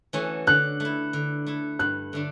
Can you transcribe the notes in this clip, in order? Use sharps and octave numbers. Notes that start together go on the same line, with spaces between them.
E3 A3 C#4 F#4
D3 F#6
A3 E4
D3
A3 E4
G2 F#6
D3 A3 D4